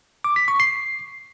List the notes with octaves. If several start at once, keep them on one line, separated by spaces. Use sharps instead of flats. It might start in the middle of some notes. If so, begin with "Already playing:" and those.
D6
B6
C#6
C7